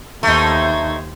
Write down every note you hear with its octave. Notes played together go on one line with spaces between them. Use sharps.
D#2 A3 D#4 C5 G#6